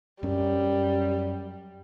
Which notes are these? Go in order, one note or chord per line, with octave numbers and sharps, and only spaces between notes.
F#2 G3 C#4